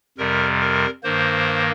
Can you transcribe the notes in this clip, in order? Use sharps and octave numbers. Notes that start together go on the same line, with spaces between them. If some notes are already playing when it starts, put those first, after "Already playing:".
F2 C3 G3 A#4
A#4
G2 D#3 A#3 C5